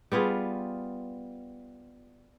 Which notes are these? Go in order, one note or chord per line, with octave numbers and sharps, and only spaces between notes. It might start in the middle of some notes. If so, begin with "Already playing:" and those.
G3 B3 F4 G#4